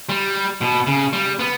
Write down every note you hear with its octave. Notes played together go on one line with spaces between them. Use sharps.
G3
B2
C#3
G3
B3